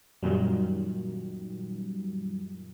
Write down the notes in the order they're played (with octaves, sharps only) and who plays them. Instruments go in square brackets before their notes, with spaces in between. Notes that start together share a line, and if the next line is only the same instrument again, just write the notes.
[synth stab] F#2 A#2 D#3 [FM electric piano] F#3 G3